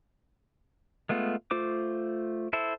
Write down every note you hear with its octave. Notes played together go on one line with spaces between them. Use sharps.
G#3 A3 B3 F4
A3 F4 C5 D6
E4 A4 C5 E5